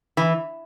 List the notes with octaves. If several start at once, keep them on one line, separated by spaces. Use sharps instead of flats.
E3